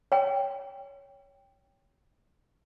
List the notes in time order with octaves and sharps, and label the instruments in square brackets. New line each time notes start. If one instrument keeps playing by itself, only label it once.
[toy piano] C#5 G5